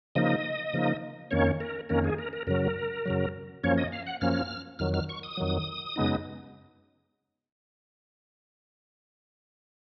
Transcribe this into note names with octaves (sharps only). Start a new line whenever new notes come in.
C#3 F3 A#3 D#4 D#5
C#3 F3 A#3 D#4
F2 D#3 A#3 C#4 C#5
A#4
F2 D#3 A#3 C#4 A#4
G#4
A#4
A#4
F#2 C#3 F#3 A#4
F#2 C#3 F#3
F#2 F3 A#3 C#4 C#5
D#5
F5
F#5
F#2 F3 A#3 C#4 F6
F2 D#3 F#3 F6
F6
C#6
D#6
F2 D#3 F#3
F#2 C#3 G#3 B3 D#4